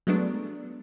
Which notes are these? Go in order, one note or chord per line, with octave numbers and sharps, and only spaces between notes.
F#3 G#3 A3 B3 D4